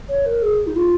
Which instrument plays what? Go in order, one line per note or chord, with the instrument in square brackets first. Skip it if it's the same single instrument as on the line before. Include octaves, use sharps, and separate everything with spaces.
[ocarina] C#5
A#4
G#4
D#4
F4